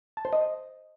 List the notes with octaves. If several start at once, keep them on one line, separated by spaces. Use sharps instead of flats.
A5
C5
D#5